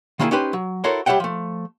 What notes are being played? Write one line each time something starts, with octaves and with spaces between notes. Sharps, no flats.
D#3 A#3 B3 D#4 E4 G#4
C#4 D#4 G4 B4 C5
F#3
E4 F#4 A4 A#4 C5 C#5
G3 G4 C#5 E5 F#5 G5
F3 A3